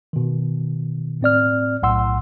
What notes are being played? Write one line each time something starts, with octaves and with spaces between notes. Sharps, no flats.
B2 D#3
A2 C4 D5 F6
B1 A2 F#5 C6 E6